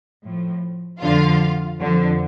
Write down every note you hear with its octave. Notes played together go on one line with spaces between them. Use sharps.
A2 F3
F2 D3 F3 F4 F5
F2 D3 F3